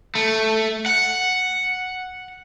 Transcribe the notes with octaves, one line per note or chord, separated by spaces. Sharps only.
A3
F#5